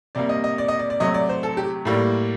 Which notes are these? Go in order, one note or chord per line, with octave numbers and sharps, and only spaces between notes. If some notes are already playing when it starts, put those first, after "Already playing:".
C3 G3 A#3 D5
D#5
D#5
D5
D#5
D5
D5
C3 F#3 A3 D#5
D5
C5
A4
G4
A2 G3 A#3